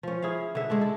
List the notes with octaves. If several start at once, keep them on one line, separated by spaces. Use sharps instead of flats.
F3 C#4
E4 G#4 E5 F5
D3 E5
G#3 A3 D4
A4